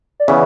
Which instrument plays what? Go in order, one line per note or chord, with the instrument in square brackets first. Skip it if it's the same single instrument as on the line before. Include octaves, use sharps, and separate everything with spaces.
[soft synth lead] D5
[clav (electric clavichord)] C#3 E3 B3 [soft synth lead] E5